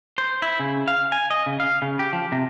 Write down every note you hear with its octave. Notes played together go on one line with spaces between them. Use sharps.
C5
E4
C#3
F5
G#5
D#5
C#3
F5
C#3
G4
F3
C3